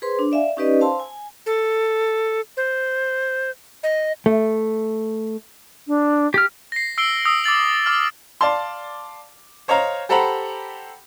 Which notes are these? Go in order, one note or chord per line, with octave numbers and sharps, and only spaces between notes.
G#4 B4 C5 C6
D4
D5 E5 F5 G#5
C#4 D#4 G4 B4 D5 D#5
C5 F5 A5 C6 E6
G#5
A4
C5
D#5
A3
D4
G4 F6
A#6 C7
E6 C7 D7 G7
D#6 E6 C7
D6 E6 A6 F#7
D6 F6
D5 F5 A5 C6
C5 C#5 D#5 F5 A#5
G4 A4 C5 F#5 A#5 B5